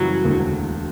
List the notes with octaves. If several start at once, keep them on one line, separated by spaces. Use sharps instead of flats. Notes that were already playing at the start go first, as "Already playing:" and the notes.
Already playing: F#2 C#3 E3 F#3 G3
E1 D2 D3